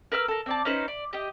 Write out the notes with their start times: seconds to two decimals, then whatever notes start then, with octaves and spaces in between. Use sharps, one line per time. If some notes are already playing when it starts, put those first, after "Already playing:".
0.12 A#4 B4 E6 F6
0.28 A4 A#4
0.46 C4 D5 A5
0.65 C#4 D#4 B4 C5
0.88 D5
1.13 G4 D#5